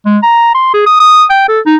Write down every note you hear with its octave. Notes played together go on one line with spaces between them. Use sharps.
G#3
A#5
C6
G#4
D#6
D#6
G5
A4
D#4